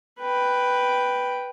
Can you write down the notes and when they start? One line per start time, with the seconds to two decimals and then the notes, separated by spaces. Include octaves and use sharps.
0.20 B4 G5